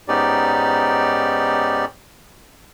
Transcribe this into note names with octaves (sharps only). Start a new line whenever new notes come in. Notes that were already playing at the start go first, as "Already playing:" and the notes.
G#2 B3 C#4 D#4 G4 D5